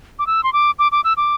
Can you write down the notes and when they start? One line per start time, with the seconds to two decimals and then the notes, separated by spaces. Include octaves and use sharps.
0.19 D6
0.27 E6
0.44 C6
0.53 D6
0.79 D6
0.92 D6
1.04 E6
1.17 D6